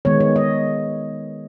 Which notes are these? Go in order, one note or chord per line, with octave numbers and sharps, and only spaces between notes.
D#3 G#3 B3 C#5
C#5
D#5